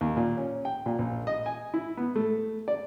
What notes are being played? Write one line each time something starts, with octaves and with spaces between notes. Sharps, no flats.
D#2
A#2
C#4
G5
A#2
A#1
D#5
G#5
E4
B3
A3
D5